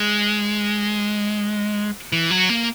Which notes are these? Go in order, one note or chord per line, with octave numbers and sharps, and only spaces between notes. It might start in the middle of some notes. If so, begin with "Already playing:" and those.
Already playing: G#3
E3
F#3
A#3